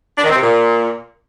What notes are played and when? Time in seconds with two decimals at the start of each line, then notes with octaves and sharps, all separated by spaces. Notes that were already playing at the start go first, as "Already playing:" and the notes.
0.17 D4
0.23 D#3
0.29 C4
0.35 C3
0.41 A#2